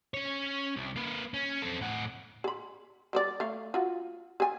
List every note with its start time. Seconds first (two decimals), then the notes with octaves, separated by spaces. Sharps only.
0.14 C#4 C#5
0.76 C2
0.96 A#3 B4
1.34 C#4
1.62 C4 A4
1.81 A2 F#5
2.44 G#4 B5
3.13 G3 C5 D5
3.40 A3 F5
3.74 F4 F#4
4.40 G#4 G#5